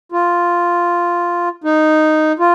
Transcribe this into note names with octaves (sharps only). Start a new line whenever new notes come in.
F4
D#4
F4